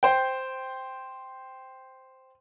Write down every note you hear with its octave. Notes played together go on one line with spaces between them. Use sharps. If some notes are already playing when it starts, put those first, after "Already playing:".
C5 G5